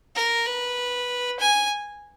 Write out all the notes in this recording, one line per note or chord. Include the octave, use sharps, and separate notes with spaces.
A#4
B4
G#5